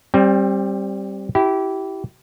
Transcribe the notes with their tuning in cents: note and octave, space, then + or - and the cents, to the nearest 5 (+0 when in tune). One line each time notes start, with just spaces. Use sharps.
G3 +0 C4 +25
E4 +0 G4 -25